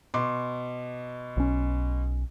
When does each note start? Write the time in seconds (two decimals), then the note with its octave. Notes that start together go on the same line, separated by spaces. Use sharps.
0.14 B2 C6 D6
1.37 B1 C#4